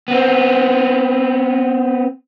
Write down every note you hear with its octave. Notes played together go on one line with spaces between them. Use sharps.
B3 C4